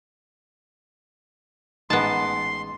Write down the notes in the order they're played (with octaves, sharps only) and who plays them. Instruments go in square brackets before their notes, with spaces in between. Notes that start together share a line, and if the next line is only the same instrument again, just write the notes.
[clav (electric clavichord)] A1 G#3 D#4 [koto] B3 A5 [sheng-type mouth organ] C6